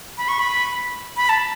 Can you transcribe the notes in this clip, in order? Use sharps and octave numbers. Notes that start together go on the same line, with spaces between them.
B5
C#6
B5
B5
A5